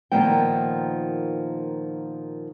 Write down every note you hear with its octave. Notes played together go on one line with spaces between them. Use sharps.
A#2 D#3 F3 B3 G5